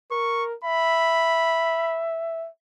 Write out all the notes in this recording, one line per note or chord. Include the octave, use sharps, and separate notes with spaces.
A#4 C#6
E5 B5